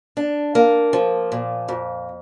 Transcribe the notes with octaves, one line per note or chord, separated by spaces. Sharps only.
D4
A#3
F3
A#2
F2